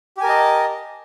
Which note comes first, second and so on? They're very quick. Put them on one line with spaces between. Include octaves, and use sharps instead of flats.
G4 G#5 A#4 A5 D#5